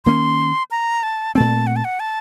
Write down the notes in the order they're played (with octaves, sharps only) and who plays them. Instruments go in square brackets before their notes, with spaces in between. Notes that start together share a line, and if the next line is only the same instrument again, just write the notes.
[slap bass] D#3 A#3 C#4 [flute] C6
[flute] A#5
A5
[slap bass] A#2 A3 C4 [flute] A5
[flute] F#5
A5
F#5
A5